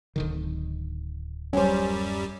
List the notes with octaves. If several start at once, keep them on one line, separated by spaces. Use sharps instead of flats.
D1 D3 D#3
F#2 G3 C#4 C5